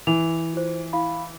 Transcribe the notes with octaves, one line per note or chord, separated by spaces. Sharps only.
E3 F7
F4 C5
E4 F5 B5